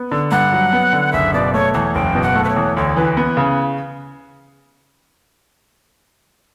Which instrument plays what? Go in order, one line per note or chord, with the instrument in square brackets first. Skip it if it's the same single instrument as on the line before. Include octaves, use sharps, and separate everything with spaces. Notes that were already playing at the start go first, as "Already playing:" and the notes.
Already playing: [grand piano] B3
D3
[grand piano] G2 [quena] F#5
[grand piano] F#3
B3
D3
[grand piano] F#1 [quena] E5
[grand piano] B2 [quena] D5
[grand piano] A3 [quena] C#5
[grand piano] E2 [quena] C#5
[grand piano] F#1 [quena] G5
[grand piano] B2
[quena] F#5
[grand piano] A3
[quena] B4
C#5
[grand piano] E2
[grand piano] D2 [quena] C#5
[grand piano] E3 [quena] B4
[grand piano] B3 [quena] B4
[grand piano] C#3